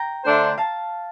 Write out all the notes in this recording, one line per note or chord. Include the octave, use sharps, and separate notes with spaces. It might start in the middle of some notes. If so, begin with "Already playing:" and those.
Already playing: G5 A#5
D3 A3 D4 A4 C5
F5 A5